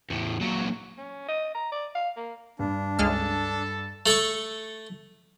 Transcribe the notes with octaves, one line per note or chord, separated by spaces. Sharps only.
E2 A2
A#2 F#3
C#4
D#5
A#5
D5
F5
A#3
G2 D4
C#2 G#3 A4 A5 F6
A3 A4 A5 C#6